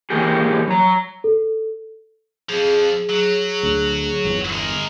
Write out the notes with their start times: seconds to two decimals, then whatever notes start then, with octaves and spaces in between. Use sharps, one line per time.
0.10 E3 G#3 A#3 G4 G#4
0.68 F#3 A#5
1.24 A4
2.49 F2 F3 G#4
3.09 F#3
3.63 D2
4.25 G1 E2
4.52 G#3 A#4